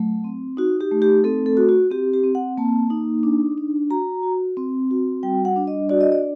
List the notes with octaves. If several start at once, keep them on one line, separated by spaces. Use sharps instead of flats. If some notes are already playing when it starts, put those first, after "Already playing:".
Already playing: F#3 A3
C4
D#4 F#4
G4
A3
G4
C4 A4
A4
F#4
F#4
C4 G4
G4
C4
F#5
A#3 A5
D#4
D4
D4
F#4 A#5
F#4
C4
F#4
G3 G5
F#5
D4
D#5
F#4 D5
D#5
D5